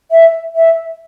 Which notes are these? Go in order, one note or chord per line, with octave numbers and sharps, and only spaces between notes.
E5
E5